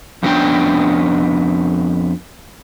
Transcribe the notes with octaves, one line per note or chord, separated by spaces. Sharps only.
F2 A2 B3 C#4 D4 G5